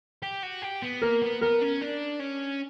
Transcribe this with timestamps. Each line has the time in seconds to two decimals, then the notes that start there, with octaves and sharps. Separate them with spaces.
0.23 G4
0.43 F#4
0.62 G4
0.82 B3
1.02 A#3 A#4
1.22 B3
1.41 B3 A#4
1.61 C#4
1.81 D4
2.20 C#4